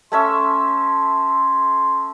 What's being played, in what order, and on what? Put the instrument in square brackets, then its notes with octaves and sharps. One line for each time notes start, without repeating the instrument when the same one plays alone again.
[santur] A3 C#4 E5 [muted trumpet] C6